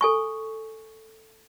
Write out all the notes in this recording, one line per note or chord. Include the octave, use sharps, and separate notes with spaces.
A4 G#5 C#6